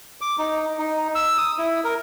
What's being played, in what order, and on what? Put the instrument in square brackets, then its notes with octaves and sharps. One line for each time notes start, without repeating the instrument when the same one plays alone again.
[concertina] D6
D#4
D#4
E6
D#6
E4
A#4